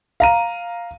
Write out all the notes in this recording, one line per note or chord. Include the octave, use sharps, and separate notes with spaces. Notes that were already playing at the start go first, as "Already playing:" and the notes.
F5 A#5 D#7